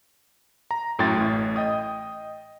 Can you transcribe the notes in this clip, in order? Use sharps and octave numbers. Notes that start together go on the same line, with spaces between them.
A#5
F#2 A2 F#3 G5 C6 A6
A1 A2
D#5 G5 D#6